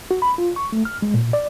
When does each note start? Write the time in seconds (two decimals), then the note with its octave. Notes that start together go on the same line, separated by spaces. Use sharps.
0.11 F#4
0.22 B5
0.38 F4
0.56 C#6
0.72 A3
0.85 F6
1.02 G#3
1.14 A#2
1.33 D5